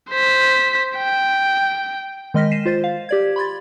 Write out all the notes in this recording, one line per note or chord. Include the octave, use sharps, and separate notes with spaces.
C5 B6
G5
D#3 G#3 D#5 F6 A#6 B6
B6 C7 D#7 E7
F4 C5 A6
F5
G4 D5 G#6
B5 C6 G#6 A6